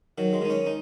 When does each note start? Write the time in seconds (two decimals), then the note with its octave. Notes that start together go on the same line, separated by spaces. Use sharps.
0.18 D#3 F#3
0.33 G#3
0.41 D#3 D#4
0.50 C#4
0.66 D#4